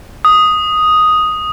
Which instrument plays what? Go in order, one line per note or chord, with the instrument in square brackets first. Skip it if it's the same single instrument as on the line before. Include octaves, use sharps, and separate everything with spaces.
[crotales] D#6